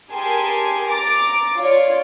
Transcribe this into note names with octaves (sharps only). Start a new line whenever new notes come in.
G4 G#4 A#4 G#5 A5 C6
A#5 D6 A6
F4 C#5 D5